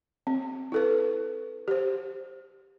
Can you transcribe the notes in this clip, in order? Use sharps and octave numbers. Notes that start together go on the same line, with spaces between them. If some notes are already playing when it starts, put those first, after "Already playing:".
C4
E4 A4 B4
G4 C5